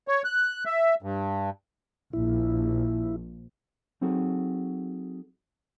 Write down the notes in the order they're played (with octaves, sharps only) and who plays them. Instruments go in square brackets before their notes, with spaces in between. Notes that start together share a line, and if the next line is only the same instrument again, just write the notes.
[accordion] C#5
F#6
E5
G2
[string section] A#1 [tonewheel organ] E4
[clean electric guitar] F#3 C4 D#4 F#4 G#4 A4